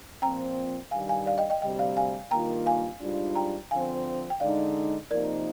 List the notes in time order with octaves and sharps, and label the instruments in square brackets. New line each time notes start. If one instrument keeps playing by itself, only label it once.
[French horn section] A#2 F3 C4 [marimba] G5 A#5
[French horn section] G2 D#3 G3 [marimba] F5 G#5
[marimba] F5 G#5
D5 F5
D#5 G5
D#5 G5
[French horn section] D2 C3 G3 [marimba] D#5 G5
[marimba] D5 F5
F5 G#5
[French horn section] G2 D#3 A#3 F4 [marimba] G5 A#5
[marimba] F5 G#5
[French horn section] G#2 G3 D4 F4
[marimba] G5 A#5
[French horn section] D3 F3 C4 [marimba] F5 G#5
[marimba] G5
[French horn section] D3 G#3 D#4 [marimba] D5 F5
[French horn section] C3 F3 A#3 D#4 [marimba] A#4 D5